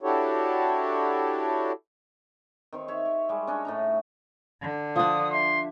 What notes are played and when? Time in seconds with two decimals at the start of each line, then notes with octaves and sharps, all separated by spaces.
0.01 D4 E4 F#4 G4 A4 C#5
2.73 D#3 C4 C#5
2.88 C#5 E5 C#6
3.05 G4
3.29 G3 G#3
3.47 C#4 D4 C#5 D#5
3.65 A2 D#4 A#5
4.62 D3
4.96 F3 D4 D#6
5.32 E5 C6